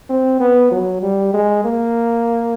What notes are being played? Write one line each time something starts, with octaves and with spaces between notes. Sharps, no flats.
C4
B3
F#3
G3
G#3
A#3